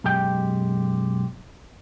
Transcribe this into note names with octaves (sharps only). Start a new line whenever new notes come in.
B1 F#2 G#3 G4 G5